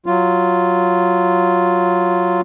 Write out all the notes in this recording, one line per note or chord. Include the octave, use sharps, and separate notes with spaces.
F#3 F4